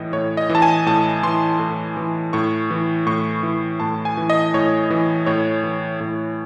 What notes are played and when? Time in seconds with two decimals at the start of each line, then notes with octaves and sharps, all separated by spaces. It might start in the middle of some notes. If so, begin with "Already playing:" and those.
Already playing: A2 E3 D#5
0.13 A2 C#5
0.37 D#5
0.50 E3
0.55 A5
0.62 G#5
0.86 A2 A5
1.23 E3 C6
1.59 A2
1.97 E3
2.33 A2 C#6
2.71 E3
3.06 A2 C#6
3.43 E3
3.80 A2 A5
4.05 G#5
4.17 E3
4.30 D#5
4.54 A2 C#5
4.90 E3
5.26 A2 C#5
5.64 E3
6.00 A2